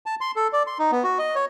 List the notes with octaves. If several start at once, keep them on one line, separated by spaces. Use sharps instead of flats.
A5
C6
A4
D5
C6
D#4
B3
F#4
D#5
C#5